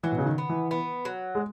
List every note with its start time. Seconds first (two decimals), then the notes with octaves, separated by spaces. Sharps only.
0.03 E3 F#3
0.12 B2
0.18 C#3
0.26 D#3
0.38 B3
0.49 E3
0.71 B3
1.05 F#3
1.35 G#3